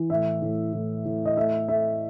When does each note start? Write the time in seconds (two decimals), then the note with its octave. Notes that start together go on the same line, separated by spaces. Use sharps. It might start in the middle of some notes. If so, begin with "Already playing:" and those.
Already playing: E3
0.10 A2 E5
0.42 A2
0.73 A2
1.05 A2
1.26 D#5
1.37 A3 E5
1.68 A3 E5